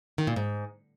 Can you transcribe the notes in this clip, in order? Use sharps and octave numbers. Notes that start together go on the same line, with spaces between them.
D#3
A#2
G#2